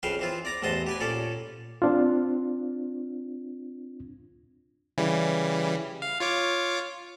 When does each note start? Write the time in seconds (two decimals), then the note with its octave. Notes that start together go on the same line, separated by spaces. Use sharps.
0.03 F2 C#3 B4 F5 G5
0.19 E3 C4 F4
0.45 D5 A#5 D6
0.62 A1 E2 C4 D#5 A5
0.86 G4 B4 G#5
1.00 A#2 C#4 A4 D5
1.82 C4 D4 F4
4.98 C#3 E3 G3
6.02 F5
6.20 F4 C#5 D6